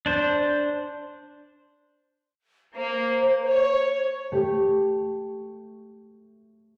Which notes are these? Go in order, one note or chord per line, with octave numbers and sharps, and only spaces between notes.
D4 C5
A#3 C5
C#5
A3 G4